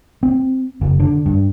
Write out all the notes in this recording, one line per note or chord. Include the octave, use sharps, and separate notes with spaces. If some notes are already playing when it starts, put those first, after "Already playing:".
C4
F#1
D3
G2